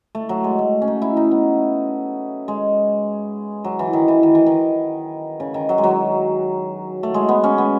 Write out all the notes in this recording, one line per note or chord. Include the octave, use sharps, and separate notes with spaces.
A3
F#3
G#3
A3
C#4
D#4
E4
D#4
B3
G#3
F#3
E3
D#3
E3
D#3
E3
D#3
C#3
D#3
F#3
G#3
F#3
A3
G#3
B3
C#4
B3